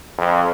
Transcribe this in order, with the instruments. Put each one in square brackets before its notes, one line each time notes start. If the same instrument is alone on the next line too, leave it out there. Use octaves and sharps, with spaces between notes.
[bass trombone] F2